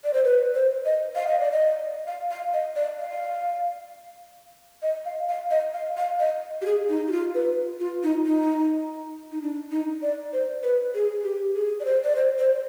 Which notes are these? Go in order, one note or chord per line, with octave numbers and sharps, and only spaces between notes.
D5
C5
B4
C5
D#5
F5
D#5
D5
D#5
F5
F5
D#5
D5
F5
D#5
F5
F5
D#5
F5
F5
D#5
G4
G#4
D#4
G4
F4
B4
F4
D#4
D#4
D#4
D4
D#4
D5
C5
B4
G#4
G4
G#4
D5
C5
D5
C5
C5